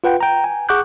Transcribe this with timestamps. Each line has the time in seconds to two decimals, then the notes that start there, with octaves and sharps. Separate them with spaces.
0.04 F4 B4 F#5 G5
0.21 G5 A#5
0.44 G#5
0.69 G#4 F#5 C#6 D6 F#6 G6